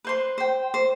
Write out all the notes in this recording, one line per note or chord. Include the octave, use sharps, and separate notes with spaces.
B4 C5 C6
C5 G5
C5